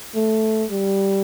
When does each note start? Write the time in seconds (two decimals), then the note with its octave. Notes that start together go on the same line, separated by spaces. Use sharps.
0.15 A3
0.71 G3